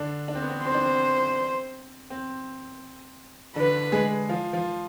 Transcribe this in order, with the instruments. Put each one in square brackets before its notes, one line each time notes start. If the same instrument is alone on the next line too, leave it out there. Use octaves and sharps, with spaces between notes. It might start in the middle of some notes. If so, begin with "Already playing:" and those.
Already playing: [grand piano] D3 D4
D4
C4
B3
C4
[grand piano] C4 [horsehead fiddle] C5
[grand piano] D4
C4
C4
[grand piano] D3 D4 [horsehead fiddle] B4
[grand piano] G#3 G#4
F3 F4
F3 F4